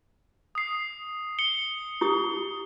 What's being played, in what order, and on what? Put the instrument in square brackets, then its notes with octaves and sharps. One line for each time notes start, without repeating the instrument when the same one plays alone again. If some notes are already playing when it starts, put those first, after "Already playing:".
[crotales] D#6 C7
C#7 G7
[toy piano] E4 G4 D#6